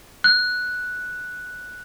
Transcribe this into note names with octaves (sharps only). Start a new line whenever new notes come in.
F#6